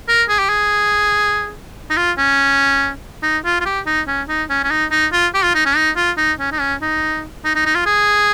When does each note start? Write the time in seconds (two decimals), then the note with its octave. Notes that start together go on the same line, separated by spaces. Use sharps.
0.08 A#4
0.29 G#4
0.39 G4
0.49 G#4
1.90 D#4
1.97 F4
2.18 C#4
3.23 D#4
3.45 F4
3.61 F4
3.65 G4
3.86 D#4
4.08 C#4
4.29 D#4
4.50 C#4
4.64 C#4
4.71 D#4
4.92 D#4
5.13 F4
5.34 G4
5.44 F4
5.55 D#4
5.66 C#4
5.76 D#4
5.96 F4
6.17 D#4
6.40 C#4
6.52 D#4
6.60 C#4
6.82 D#4
7.45 D#4
7.55 D#4
7.66 D#4
7.75 F4
7.86 G#4